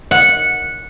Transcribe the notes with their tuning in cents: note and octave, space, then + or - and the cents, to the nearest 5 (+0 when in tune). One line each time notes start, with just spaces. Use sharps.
F#5 -10